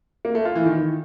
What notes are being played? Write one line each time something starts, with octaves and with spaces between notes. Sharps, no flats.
A#3
A3
F4
E3
D#3